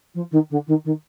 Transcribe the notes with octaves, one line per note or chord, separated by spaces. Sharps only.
F3
D#3
D3
D#3
D#3